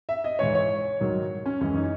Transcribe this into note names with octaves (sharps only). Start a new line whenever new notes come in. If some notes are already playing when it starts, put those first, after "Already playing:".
E5
D#5
G#2 E3 G#3 C#5
C#5
G#2 D#3 F#3
C#4
F#2 E3 G#3 C#4
D#4